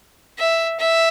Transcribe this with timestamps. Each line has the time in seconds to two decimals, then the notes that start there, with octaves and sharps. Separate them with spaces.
0.39 E5
0.79 E5